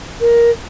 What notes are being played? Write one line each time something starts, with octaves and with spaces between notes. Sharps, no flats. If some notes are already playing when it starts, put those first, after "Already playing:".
A#4